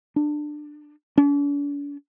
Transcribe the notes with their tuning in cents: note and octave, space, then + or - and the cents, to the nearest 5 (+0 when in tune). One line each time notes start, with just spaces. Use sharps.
D4 +20
D4 -45